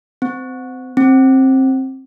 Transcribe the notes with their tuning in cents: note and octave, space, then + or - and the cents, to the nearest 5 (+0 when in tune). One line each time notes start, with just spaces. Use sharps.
C4 -25
C4 +20